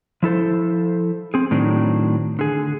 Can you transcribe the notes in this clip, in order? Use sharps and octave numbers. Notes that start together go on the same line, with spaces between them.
F3 E4 A4 C5
C4 G#4
A2 D#3 F#3 C4 D4 D#4
D3 G#4